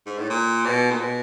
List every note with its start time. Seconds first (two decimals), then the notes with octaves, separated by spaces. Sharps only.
0.06 G#2
0.18 A2
0.30 A#2
0.65 B2
0.91 A#2
1.00 B2